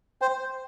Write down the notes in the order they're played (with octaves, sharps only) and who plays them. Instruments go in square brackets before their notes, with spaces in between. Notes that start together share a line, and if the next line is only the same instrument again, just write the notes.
[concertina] C5 [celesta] G5